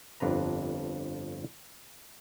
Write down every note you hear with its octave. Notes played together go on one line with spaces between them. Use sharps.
G1 F2 D4 B4 A#5